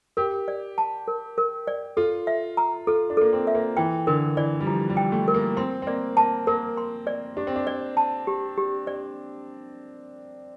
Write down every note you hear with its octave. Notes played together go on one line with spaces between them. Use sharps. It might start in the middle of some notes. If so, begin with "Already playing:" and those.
G4 A#4
D5
A5
A#4
A#4
D5
F4 A4
E5
A#5
F4 A4
D4
A#3 A4
C4
E5
A#3
E3 G5
D3 A#4
E3 D5
G3
F3 E4
G3
G5
A3
A#4
A#3
C4 C6
C4
A#3 D5
A#3 A5
A#3 A#4
C6
D5
D4 G4
C4
D4
D5
A5
G4
G4
D5